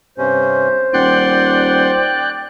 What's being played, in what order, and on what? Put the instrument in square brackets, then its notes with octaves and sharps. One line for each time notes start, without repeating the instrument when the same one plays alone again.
[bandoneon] G2 C3 C#4 [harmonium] C5
[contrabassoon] D#1 [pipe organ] D5 G5 F#6 [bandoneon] F#5 C6